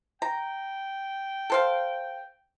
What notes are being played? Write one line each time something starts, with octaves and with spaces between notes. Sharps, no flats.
G5 A#5
A4 C5 F5